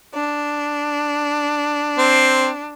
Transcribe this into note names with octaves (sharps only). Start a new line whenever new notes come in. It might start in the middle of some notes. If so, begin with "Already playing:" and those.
D4
C4